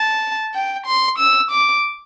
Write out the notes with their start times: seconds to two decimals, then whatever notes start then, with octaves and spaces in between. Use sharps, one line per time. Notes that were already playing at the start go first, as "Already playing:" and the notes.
Already playing: A5
0.54 G5
0.87 C6
1.19 E6
1.51 D6